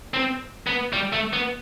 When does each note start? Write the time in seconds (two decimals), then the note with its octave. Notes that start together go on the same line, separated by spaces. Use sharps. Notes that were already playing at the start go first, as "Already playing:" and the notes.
0.14 C4
0.67 B3
0.93 G3
1.13 A3
1.33 B3